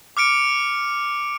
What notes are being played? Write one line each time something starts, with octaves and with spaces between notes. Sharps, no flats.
D6 F6 C#7 D7